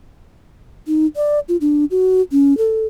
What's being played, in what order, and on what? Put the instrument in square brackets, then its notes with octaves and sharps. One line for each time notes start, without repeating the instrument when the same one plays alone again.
[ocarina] D#4
D5
F4
D4
F#4
C#4
A4